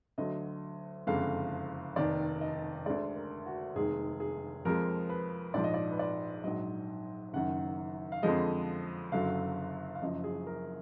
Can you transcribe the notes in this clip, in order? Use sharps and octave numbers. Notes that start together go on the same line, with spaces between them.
D2 D3 F#3 D#5
F#1 F2 D3 G#3 F5
F1 D#2 D#3 D5
D#5
D2 D3 G#3 D5
A#4
F#4
F1 D#2 D#3 G#3 G#4
G#4
F2 F3 G#3 A#4
B4
A#1 G#2 F3 D5
D#5
D5
B4
D5
A#1 G#2 F#3 D#5
F#1 F#2 D#3 F#5
F5
F2 D3 F3 G#3 D#5
F#1 F#2 D3 F#3 F5
F5
F#1 F#2 F3 D#5
G#4
A#4